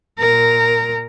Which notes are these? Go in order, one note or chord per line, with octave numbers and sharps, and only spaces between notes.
A#2 A#4